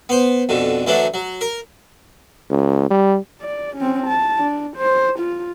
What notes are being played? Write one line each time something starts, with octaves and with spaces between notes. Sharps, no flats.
B3 C5
F2 B2 D3
D2 E3 F#3 A3 D4
F#3
A#4
C#2
G3
D5
C4 C#4
A5
D4
C5
F4